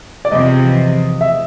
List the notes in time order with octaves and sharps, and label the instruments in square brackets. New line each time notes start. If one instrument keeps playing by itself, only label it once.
[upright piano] D5
[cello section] E2 C3 F3 [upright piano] D#5
[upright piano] E5